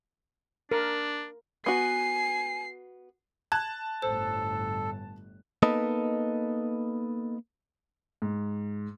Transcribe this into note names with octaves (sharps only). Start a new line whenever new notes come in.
D4 A#4
B3 F#4 G#5 C7
A5 F#6 G#6
G1 A2 A4 C5
A#3 B3 D#4 A4 B4 D#5
G#2